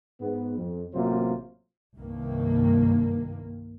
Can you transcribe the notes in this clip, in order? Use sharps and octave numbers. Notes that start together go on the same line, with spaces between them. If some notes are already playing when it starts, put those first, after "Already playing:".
G#2 B3
F2
A1 C3 F#3 A#3 F4 C5
C2 G2 D#3 A#3